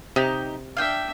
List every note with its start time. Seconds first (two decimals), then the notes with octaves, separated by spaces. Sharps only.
0.16 C3 D#4 G4
0.77 D4 E5 F5 G5